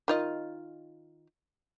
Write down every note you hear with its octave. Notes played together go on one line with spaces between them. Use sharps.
D#3 F4 D#5